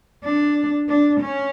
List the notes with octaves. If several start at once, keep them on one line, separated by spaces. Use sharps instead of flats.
D4
D4
C#4